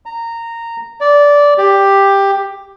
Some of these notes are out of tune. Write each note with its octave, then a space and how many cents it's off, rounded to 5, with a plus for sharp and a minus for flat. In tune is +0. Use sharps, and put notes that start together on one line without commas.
A#5 -15
D5 -15
G4 +10